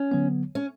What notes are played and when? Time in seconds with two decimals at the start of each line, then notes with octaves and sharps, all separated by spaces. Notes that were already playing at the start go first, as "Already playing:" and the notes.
Already playing: C#4
0.12 D3 F#3 B3
0.55 C#4